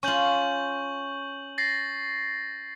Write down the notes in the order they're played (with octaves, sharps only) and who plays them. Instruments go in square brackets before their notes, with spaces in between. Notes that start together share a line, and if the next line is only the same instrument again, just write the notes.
[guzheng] C#4 F4 [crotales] C#6 G6 F#7
[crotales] A6 A#6 C7